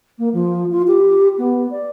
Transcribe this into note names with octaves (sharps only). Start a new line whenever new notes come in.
A#3
F3
F4
G4
B3
D5